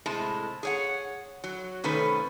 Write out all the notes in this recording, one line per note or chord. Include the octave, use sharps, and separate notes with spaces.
A2 C3 G#3 A5
G#4 C#5 F#5
F#3
C3 D#3 A3 C#4 B4